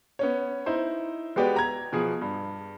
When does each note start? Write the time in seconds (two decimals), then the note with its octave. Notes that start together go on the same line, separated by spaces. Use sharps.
0.19 B3 C#4 C#5
0.66 D#4 E4 C5
1.36 G#3 B3 F#4 G4 B4 D5
1.56 A#5 G#6
1.93 B2 F3 G#4
2.21 G2